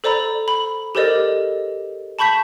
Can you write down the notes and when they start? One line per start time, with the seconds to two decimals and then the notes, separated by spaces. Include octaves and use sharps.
0.04 A4 C5 D5 A#5 B5
0.48 B5
0.95 G4 A4 A#4 C5 D5 D#5
2.19 A5 B5 C#6 G6 B6